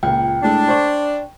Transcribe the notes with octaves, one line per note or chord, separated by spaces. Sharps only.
C#2 A#2 G5
A2 G#3 A3 D4
C5 D5 C#6